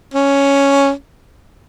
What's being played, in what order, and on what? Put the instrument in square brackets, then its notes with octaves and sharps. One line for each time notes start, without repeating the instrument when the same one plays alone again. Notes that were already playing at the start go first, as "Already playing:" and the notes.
[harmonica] C#4